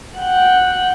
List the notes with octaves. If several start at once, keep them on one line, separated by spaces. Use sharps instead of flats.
F#5 G5